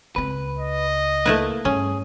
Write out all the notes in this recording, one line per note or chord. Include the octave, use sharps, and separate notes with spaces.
C#2 C4 B4
D#5
A3 A#3 E4 B4
G2 C#4 G#4